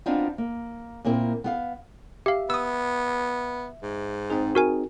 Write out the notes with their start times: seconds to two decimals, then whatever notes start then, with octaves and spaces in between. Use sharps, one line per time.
0.06 B3 C4 D4 D#4 F4
0.38 A#3
1.05 A#2 A#3 C4 E4
1.44 B3 G4 F5
2.26 G4 E5 F5
2.50 B3 D#6 E6
3.83 G#2
4.30 C4 D#4 G#4
4.55 F#4 A#4 G#5